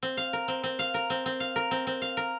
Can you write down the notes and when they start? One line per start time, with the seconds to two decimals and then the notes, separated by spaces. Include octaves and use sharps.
0.03 C4
0.17 F5
0.33 A#4
0.48 C4
0.64 C4
0.79 F5
0.94 A#4
1.10 C4
1.26 C4
1.40 F5
1.56 A#4
1.71 C4
1.87 C4
2.02 F5
2.17 A#4